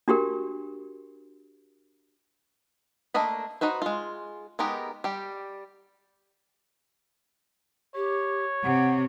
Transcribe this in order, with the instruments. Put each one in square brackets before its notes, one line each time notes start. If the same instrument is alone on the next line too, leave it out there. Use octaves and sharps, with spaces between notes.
[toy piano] D4 F#4 G4 A#4
[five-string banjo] A3 A#3 D4 D#5 B5
D#4 F#4 B4 C5
G#3 F4
G#3 B3 D#4 G4 A#4
G3 G4
[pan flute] G4 [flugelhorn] C#5
[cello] C3 [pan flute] F#5